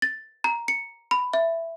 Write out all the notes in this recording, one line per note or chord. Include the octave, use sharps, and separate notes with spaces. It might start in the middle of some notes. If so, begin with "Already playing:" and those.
A6
A#5
C#7
B5
E5